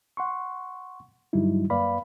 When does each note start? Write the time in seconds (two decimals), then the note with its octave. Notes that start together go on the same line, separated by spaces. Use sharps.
0.17 F#5 C6 C#6
1.33 G2 D3 F#3 G3 D#4 E4
1.70 F#2 A#3 B4 D5 F5 B5